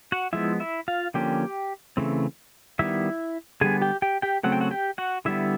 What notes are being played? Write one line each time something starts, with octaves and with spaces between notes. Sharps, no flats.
F#4 F#5
F3 G#3 B3 E4 E5
E4 E5
F4 F5
D3 F3 A#3 C#4 G4 G5
C#3 E3 A3 C4
D#3 G3 B3 E4 E5
D3 G3 B3 G#4 G#5
G4 G5
G4 G5
G4 G5
C#3 F#3 A3 C4 F#5
G5
F#4 F#5
G4 G5
F#4 F#5
D3 G3 B3 E4 E5